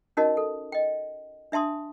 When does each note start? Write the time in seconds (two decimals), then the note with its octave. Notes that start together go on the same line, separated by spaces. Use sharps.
0.17 C#4 D#4 F#4 A#4 D#5 A5
0.37 A4
0.72 D#5 G5
1.52 D4 E5 A5 C6 D#6